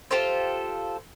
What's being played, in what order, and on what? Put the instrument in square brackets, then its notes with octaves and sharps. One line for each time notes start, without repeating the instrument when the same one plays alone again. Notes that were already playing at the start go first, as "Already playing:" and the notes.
[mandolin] F4 G4 A4 C5